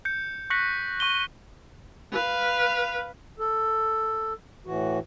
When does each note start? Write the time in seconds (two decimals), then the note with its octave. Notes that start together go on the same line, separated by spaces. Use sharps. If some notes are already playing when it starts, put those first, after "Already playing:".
0.05 G6 C#7
0.50 C#6 F#6 A#6 B6 C#7 F#7
1.00 C#6 D#7 G7
2.13 B4 F5
3.39 A4
4.66 A2 E3 F#4